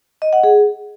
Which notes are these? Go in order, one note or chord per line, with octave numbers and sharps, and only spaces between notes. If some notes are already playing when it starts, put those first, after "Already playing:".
D#5
F#5
G#4